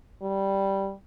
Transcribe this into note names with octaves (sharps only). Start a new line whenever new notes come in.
G3